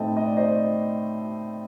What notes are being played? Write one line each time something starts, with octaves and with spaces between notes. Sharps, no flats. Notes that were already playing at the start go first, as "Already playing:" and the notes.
Already playing: A2 A3 C4 D#4 D#5 G5 A5
D#5
D5
C5 D#5